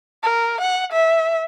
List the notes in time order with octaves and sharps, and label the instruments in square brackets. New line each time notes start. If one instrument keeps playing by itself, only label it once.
[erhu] A#4
F#5
E5